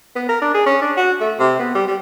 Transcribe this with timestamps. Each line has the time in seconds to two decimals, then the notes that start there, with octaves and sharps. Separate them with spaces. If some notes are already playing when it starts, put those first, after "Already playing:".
0.16 B3
0.29 A#4
0.42 D4
0.54 G#4
0.66 C#4
0.82 D4
0.97 F#4
1.20 A3
1.39 C3
1.59 B3
1.75 G3
1.88 G3